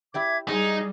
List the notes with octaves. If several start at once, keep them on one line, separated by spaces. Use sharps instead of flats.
E4 G4 D5 E5 D6 G#6
G3 G#3 D#4 G#4